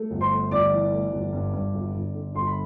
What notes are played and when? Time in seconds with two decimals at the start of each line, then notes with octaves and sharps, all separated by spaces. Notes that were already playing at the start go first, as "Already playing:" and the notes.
Already playing: A3
0.11 G1
0.21 C5 C6
0.31 A3
0.51 G1 D5 D6
0.72 E3
0.92 A3
1.12 G1
1.33 G2
1.53 G2
1.74 G1
1.94 G1
2.15 D3
2.35 G1 C6
2.47 B5